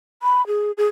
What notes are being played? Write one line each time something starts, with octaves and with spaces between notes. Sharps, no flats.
B5
G#4
G#4